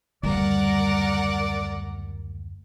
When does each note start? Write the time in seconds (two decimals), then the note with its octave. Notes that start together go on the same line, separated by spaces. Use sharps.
0.23 F#1 D2 G3 A#4 D5 F#5